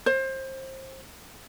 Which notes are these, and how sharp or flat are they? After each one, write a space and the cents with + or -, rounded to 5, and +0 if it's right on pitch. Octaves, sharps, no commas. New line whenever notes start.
C5 +25